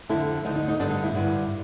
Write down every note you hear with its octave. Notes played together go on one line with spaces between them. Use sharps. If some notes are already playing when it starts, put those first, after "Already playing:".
F2 D3 E4
D2 D3 D#4
D#4
D#4
G2 D3 D4
D#4
E4
G2 D3